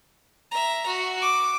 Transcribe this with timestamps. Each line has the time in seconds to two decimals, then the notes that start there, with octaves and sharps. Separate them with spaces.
0.51 E5 A#5
0.87 F#4
1.22 D6